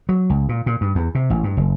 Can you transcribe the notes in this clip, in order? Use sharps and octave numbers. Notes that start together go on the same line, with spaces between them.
F#3
C#2
A#2
A#2
G2
E2
C3
A1
G2
F#1